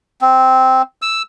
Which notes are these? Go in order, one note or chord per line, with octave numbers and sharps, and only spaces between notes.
C4
E6